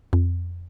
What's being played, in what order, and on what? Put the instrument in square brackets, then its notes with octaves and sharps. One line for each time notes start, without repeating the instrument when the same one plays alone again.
[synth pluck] F2